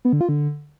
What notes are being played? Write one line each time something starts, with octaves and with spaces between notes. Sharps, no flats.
B3
D3
F4
D3